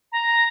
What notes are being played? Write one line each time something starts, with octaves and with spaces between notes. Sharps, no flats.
A#5